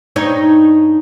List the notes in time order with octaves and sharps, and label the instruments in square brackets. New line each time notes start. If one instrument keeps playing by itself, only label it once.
[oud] G2 D#4 C#5